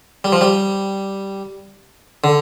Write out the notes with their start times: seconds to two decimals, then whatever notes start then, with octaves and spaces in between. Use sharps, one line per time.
0.24 G3
0.33 F3
0.41 G3
2.24 D3